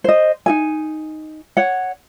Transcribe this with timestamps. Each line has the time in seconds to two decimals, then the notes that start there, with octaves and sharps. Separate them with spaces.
0.04 C5 D#5
0.46 D#4 G#4 G#5
1.57 C#5 F#5